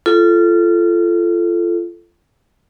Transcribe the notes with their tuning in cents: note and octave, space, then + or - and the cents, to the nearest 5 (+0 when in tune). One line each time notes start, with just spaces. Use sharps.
F4 -25 A4 -10